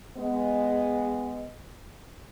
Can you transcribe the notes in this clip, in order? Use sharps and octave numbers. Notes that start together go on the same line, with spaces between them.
G#3 B3